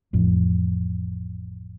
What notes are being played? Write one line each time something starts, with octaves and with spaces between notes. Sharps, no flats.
A1 F2